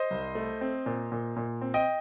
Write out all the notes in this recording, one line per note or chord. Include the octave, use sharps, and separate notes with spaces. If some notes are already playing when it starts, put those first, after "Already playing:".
Already playing: C5 D#5
C2
A3
C4
A#2
A#2
A#2
C4
D#5 G5